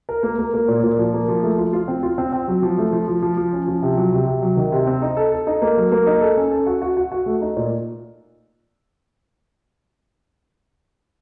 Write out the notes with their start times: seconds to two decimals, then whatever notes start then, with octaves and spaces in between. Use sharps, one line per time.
0.09 A#4
0.23 A#3
0.38 A#3
0.54 A#3
0.68 A#2
0.83 A#2
0.98 F3
1.14 A#3
1.28 F3
1.43 A3
1.58 F4
1.73 F4
1.88 C4
2.03 F4
2.18 C4
2.33 C4
2.48 F#3
2.62 F3
2.78 A3
2.93 F3
3.08 F3
3.22 F3
3.37 F3
3.53 C#4
3.68 F3
3.82 C3
3.97 F#3
4.12 C3
4.27 C3
4.42 F#3
4.57 D#3
4.72 C3
4.87 C4
5.02 D#4
5.17 A4
5.32 A4
5.47 D#4
5.62 A#3
5.77 F#3
5.92 A#3
6.07 D#4
6.21 A4
6.37 C#4
6.51 A4
6.66 F#4
6.82 F#4
6.97 F#4
7.12 F#4
7.26 A3
7.41 D#4
7.57 A#2